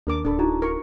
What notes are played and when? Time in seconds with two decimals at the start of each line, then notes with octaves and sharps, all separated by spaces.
0.07 D#2 D4 A#4 D6
0.25 D1 D4 A4 B5
0.39 D#4 E4 F#4 A#5
0.62 A#4 C#6